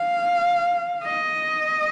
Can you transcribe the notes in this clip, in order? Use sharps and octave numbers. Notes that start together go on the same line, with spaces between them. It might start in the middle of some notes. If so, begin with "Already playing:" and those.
Already playing: F5
D#5